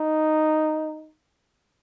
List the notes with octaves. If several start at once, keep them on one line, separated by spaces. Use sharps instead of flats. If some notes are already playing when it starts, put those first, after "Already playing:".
Already playing: D#4